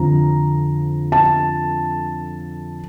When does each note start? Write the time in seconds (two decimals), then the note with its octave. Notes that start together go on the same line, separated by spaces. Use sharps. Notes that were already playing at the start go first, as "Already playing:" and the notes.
Already playing: F2 D3 F3 A#5
1.12 A5